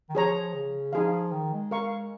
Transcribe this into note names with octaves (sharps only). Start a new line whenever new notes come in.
D#3
F3 G#4 C#5 A#5
C#3
F3 D#4 G#4 F5
D#3
G#3
A#4 F5 C#6